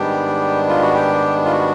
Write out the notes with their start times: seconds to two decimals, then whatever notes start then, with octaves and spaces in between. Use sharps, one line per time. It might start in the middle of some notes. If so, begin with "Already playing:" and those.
Already playing: G#2 D#3 G3 B3 D4 G4
0.69 F4
0.82 F#4
0.95 G4
1.46 F4
1.52 F#4